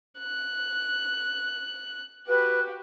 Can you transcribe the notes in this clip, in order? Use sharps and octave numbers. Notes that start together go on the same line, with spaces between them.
F#6
F#4 G4 B4 F#6